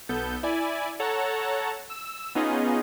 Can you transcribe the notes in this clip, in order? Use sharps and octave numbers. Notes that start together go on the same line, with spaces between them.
B1 B3 A4 G6
E4 D5 G#5
A4 C#5 F#5 A5 A#5
E6
B3 C#4 D#4 F4 G#4 D#5